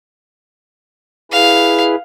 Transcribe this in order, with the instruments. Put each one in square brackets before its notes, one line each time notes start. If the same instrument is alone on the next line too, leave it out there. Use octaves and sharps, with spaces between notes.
[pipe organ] E4 G#4 B4 [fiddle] F5